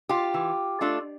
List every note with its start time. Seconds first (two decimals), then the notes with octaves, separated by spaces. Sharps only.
0.09 F4 G4
0.34 E3
0.81 A3 D4 F4